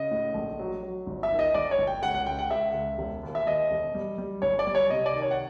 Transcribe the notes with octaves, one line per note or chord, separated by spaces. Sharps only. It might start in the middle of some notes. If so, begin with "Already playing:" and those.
Already playing: C#3 D#5
A2
A#1
F#3
F#3
G1
E5
D#3
D#5
G1 D5
C#5
G1
G5
C#2 F#5
F#5
C#2 G5
F#5
C#2 E5
C#2
E1
D#2
E5
D#2 D#5
E1
G3
G3
G1 C#5
D5
G3
C#5
C3 D#5
D5
D#3
C#5
F#5